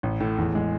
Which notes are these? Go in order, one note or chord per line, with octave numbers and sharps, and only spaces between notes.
A1
A2
E2
G#3